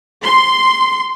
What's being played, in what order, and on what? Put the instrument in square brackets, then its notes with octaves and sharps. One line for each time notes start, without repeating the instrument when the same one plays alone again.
[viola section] C6